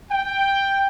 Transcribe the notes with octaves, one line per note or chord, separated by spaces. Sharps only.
G5